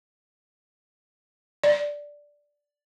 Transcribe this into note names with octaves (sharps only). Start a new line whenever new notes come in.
D5